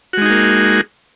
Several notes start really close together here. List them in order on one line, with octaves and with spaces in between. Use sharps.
F#4 G#3 D#4 G#4 A#3